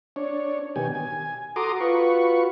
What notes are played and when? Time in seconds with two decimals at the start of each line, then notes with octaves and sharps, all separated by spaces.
0.16 D4 C#5
0.76 B2 D#3 G4 G#5
0.95 G#5
1.56 F#4 A4 A#5 C6 D6 D#6
1.80 F4 F#4 B4 C#6